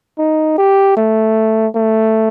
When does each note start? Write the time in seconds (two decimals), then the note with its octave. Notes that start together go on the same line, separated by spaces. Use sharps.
0.18 D#4
0.58 G4
0.97 A3
1.75 A3